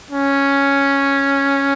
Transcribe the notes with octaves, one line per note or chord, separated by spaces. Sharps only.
C#4